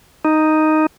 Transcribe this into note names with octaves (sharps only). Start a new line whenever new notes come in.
D#4